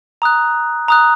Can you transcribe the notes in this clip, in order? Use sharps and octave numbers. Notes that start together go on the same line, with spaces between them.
A#5 D#6 F#6
A#5 D#6 F#6